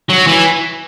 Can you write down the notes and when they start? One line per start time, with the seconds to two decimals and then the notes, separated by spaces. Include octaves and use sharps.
0.10 F#3
0.27 E3